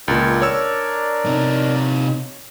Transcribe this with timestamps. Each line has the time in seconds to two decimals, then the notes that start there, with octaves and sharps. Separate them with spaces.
0.08 C#2 A#2 D4 A#4 D5
0.42 C#5 E6
1.26 C3 D#4